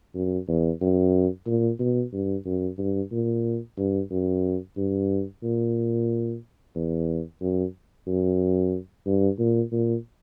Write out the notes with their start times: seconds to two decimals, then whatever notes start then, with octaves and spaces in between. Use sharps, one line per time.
0.15 F#2
0.48 E2
0.81 F#2
1.47 A#2
1.80 B2
2.13 G2
2.45 F#2
2.78 G2
3.12 A#2
3.78 G2
4.11 F#2
4.77 G2
5.43 A#2
6.75 E2
7.41 F#2
8.07 F#2
9.06 G2
9.39 A#2
9.72 A#2